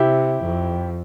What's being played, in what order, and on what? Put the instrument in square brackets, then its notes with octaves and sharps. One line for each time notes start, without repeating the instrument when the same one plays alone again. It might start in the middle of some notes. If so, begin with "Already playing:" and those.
Already playing: [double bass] C3 [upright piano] E4 G4
[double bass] F2